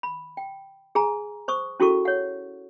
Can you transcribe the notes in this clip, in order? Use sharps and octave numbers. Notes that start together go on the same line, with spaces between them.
B5
G5
G#4 G#5 A#5
C5 C#6 D#6
C#4 E4 F#4 G#4 A4 C#6
C#5 F#5